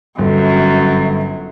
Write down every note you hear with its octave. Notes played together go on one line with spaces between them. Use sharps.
G1 F#2